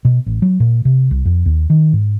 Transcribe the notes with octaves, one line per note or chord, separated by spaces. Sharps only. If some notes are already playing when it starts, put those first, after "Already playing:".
B2
A1
F#3
A#2
C3
C2
F2
D#2
D#3
G#2